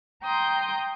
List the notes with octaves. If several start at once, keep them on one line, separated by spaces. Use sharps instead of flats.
G5 A#5 C6 D#6 G6